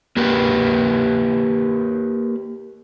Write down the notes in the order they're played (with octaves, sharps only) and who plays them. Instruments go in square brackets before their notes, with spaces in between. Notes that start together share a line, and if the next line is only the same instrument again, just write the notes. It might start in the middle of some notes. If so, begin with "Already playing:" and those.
[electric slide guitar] A#3 G4 B4